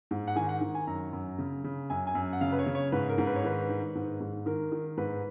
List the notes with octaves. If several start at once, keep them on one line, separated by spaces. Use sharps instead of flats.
G#2
F#5
D#3 G#5
F#5
D#3
G#5
F#2 A#5
F#2
C#3
C#3
F#2 G#5
G#5
F#2
F#5
C#3 F5
B4
C#5
C#3
C#5
G#2 B4
A#4
G#2
B4
C#5
D#3 B4
D#3
G#2
G#2
D#3 A#4
D#3
G#2 B4